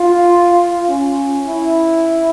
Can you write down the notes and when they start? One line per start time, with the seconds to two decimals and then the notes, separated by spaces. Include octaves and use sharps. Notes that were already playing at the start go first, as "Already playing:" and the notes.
Already playing: F4
0.89 C#4
1.48 E4